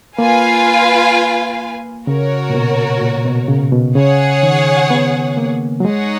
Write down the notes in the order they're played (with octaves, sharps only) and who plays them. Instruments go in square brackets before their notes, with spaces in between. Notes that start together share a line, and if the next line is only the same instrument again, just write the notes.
[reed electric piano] A#3 [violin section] F4 B4 F5 G#5
[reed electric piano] C#3 [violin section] F#4 A#4 C#5
[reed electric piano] A#2
B2
A#2
B2
C#3
B2
[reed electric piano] C#3 [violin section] G#4 C#5 F#5
[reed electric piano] D#3
B3
A#3
F#3
[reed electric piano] G#3 [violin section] D#4 G#4 C#5 F#5